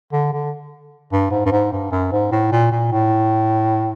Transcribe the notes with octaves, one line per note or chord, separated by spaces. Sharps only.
D3
D3
G2
G#2
G2
G#2
G2
F#2
G#2
A2
A#2
A#2
A2